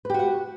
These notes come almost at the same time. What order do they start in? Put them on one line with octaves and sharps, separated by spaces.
B4 G4 F#4 F#5